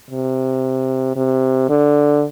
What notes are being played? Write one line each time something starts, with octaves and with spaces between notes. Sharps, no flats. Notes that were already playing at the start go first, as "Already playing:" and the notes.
C3
C3
D3